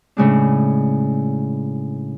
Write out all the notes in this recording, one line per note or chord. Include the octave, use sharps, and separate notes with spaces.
A2 C#3 G#3 D4